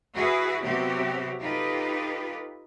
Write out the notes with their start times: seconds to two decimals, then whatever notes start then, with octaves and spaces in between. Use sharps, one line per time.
0.13 E4 F#4 G#4 B4
0.61 C3 F#3 B3 C4 F#4 G4
1.40 D#4 F4 G4 A4 B4